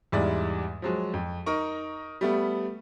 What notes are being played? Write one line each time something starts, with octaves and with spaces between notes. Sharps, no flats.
E2 G#2 G3 G#3 E4 D5
F3 F#3 G#3
F2
D#4 A#4 C#6
G3 A3 B3